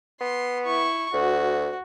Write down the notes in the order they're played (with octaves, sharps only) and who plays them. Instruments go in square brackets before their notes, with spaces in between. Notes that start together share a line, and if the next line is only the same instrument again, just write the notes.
[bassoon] B3 [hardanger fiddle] C6
[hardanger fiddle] E4 C#6
[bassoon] D2 [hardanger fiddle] F#4